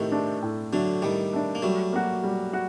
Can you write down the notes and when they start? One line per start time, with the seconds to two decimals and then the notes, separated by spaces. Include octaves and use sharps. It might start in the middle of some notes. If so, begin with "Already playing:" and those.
Already playing: A2 C3 D#3 A3
0.12 A3 D4
0.42 A2
0.73 D3 F#3 A3 D4
1.02 A2 D#3 G3
1.33 A3 D4
1.55 A#3
1.62 F#3 G3 A3
1.93 A#3 F#4
2.24 G3
2.53 F#4